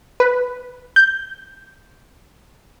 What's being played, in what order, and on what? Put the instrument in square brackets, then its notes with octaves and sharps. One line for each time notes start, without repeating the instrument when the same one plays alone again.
[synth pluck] B4
G6